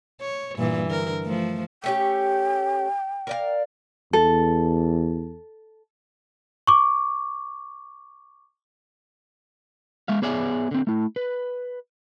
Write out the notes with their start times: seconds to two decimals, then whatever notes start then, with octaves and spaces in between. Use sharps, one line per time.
0.20 C#5
0.58 G2 A#2 E3
0.89 D3 A#4
1.23 F3 A3
1.84 A3 C#4 G4 G5
3.27 A#4 D5 F5
4.13 E2 A4
6.67 C#6 D6
10.08 G#3 E5 F5
10.22 B3 G#4 C#5 D5 E5 G#5
10.71 D3 C4
10.87 A3 E4
11.16 B4